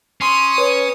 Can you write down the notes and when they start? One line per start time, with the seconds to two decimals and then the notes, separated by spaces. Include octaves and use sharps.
0.21 C#4 C6 D#6 C7
0.58 B4 C#5